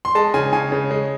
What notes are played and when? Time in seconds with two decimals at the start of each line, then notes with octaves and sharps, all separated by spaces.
0.05 C6
0.15 G#3 A5
0.34 C#3 G#5
0.52 C#3 G#5
0.72 C#3
0.91 G#3